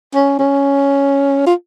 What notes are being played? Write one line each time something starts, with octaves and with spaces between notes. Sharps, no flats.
C#4
C#4
F4